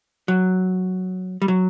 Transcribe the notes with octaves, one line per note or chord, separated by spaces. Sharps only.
F#3
G3
F#3